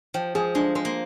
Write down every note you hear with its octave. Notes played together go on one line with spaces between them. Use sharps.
F3 G5
F3 G#4
G#3 D4
G#3 C5
A#3